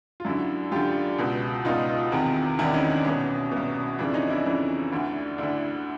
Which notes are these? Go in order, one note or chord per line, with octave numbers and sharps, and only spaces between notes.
F4
F#2 D3 E4 F#4
F#2 D3 F4 G4
C#2 B2
C#2 B2 D#4 F4
E2 C3 D#3
E2 C3 D#3 D4 E4
C#4 D#4
D4
C2 B2 C#4
C2 B2
F2 C#3 E3 D4
C#4 D#4
D4 E4
F2 C#3 E3
D2 D3
D2 D3 D4 E4